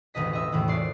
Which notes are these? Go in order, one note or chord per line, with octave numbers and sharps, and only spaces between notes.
E1 A1 D2 D3 D#5 B6
D#5 E5
E2 A2 C3 D#3 E3
G#1 F4 C#5 D5 C7